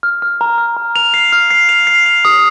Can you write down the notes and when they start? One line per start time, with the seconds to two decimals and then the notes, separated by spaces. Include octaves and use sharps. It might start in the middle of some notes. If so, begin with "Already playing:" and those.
0.03 F6
0.22 F6
0.41 A#5
0.58 F6
0.77 A#5
0.96 F7
1.14 C7
1.32 F6
1.51 C7
1.69 F7
1.87 C7
2.06 F7
2.25 D#6